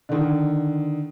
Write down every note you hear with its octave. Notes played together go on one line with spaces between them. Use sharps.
D3 D#3